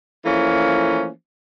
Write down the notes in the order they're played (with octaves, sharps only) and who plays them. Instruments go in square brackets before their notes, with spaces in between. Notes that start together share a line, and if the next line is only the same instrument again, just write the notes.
[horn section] E3 F3 A3 A#3 C#4